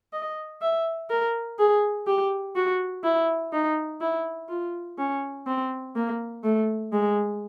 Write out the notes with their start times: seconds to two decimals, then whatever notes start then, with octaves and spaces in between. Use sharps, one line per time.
0.13 D#5
0.61 E5
1.10 A#4
1.59 G#4
2.07 G4
2.55 F#4
3.04 E4
3.53 D#4
4.01 E4
4.49 F4
4.98 C#4
5.47 C4
5.95 A#3
6.43 A3
6.93 G#3